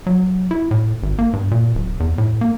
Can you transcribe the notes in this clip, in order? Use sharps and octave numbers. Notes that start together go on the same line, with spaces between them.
F#3
E4
A2
G#1
A#3
G2
A#2
D1
E2
A2
A#3